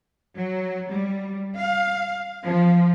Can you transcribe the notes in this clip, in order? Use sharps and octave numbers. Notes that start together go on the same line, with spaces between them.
F#3
G3
F5
F3